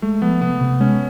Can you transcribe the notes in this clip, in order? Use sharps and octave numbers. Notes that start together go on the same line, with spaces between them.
G#3 A3
F3 B3
C3 B3
C3
G#3 C#4